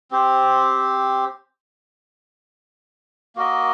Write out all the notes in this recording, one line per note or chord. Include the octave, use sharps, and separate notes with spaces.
C4 G4 C5
A#3 F#4 A#4 D#5